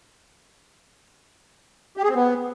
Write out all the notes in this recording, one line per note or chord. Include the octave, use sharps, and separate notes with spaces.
G4
G#4
C4
B3